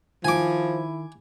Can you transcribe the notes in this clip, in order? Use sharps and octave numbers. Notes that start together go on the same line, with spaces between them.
D#3 F3 E4 G#5 D6